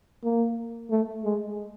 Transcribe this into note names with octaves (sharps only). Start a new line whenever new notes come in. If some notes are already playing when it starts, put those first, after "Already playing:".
A#3
A3
G#3